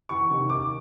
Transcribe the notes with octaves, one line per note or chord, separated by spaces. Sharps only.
E2 C#6
C3 D#3
D#2 D6